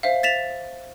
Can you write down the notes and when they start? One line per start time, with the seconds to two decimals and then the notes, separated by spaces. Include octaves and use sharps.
0.03 C5 E5 F5
0.23 A6 B6 E7 F7